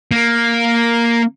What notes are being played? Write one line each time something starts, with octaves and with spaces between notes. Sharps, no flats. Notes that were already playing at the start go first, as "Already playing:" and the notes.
A#3